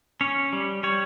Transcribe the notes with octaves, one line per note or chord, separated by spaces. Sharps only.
C#4 C#5
G3
G3 C#5